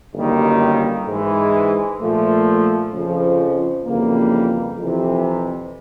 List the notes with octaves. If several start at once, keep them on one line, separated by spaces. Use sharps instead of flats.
G1 F#2 D#3 G3 A#3
G#2 E3 G#3
A#2 F3 A3
F2 C#3 F3
F2 C#3 E3 G3 A#3
F2 C3 E3